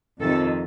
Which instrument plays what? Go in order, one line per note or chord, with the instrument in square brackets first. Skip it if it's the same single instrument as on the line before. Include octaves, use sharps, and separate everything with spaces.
[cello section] F2 C3 D#3 A4